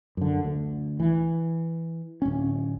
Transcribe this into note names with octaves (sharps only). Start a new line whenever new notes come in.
F#2 D3
D2
E3
D1 C#4